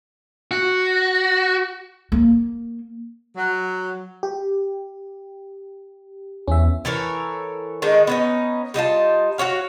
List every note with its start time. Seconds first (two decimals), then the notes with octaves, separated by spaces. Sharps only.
0.51 F#4
2.12 A#3
3.37 F#3
4.23 G4
6.48 E2 C#4 E5
6.85 E3 A4 A#4 C#5
7.82 D#3 G#3 D4 D#4
8.07 B3 C#4 D#4
8.74 G3 D#4 F4 A5
9.38 F#4 G4 C#5 F5